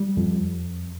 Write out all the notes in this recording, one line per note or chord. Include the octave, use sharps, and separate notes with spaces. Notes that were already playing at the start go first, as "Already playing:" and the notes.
Already playing: G3
F2